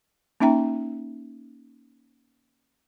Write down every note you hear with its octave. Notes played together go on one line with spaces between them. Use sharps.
A#3 C#4 D#4 E5 G5 A#5